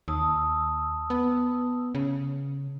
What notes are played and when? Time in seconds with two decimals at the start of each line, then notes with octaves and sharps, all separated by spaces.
0.08 D#2 A5 D#6 E6
1.10 B3
1.95 C#3